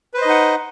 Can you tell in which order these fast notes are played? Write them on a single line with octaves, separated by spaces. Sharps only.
B4 C5 D#5 D#4 F#5